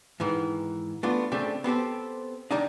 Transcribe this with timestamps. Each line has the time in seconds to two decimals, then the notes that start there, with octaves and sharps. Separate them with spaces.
0.20 G#2 D#3 E3
1.03 A3 B3 D4 F4
1.32 C#3 A3 C4 D4 G4
1.64 B3 C4 G4 A4
2.51 D#3 G3 D4 D#4